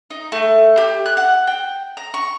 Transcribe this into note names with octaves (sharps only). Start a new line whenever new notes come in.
D#4
A3
G4
F#6
F#5
G5
A#5
C#6